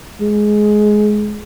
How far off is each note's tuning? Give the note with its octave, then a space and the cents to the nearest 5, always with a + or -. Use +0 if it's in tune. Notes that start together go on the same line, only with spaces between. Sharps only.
G#3 +15